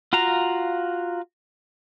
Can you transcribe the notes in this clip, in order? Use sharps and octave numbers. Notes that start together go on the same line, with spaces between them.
F4 F#4 F5 A#5